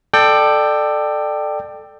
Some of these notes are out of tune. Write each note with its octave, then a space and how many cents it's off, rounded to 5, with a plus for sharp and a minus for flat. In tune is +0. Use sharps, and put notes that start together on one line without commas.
A4 +0 D5 +25 G5 +0